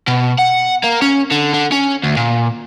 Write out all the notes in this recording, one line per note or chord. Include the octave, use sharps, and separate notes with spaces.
B2
F#5
A#3
C#4
D3
D3
C#4
D2
A#2